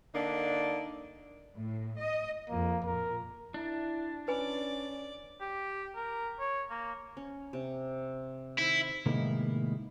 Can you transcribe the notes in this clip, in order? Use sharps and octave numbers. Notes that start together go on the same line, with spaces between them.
D3 A#3 D4 D#4 D5
A2
D#5
F2 A#3
F2 A#2 A#4
D4 E4
C#4 B4 D5 G#5 B5
G4
A#4
C#5
A#3
C#4
C3
D#3 E4 C5
A2 C3 D#3 G#3 A#3 B3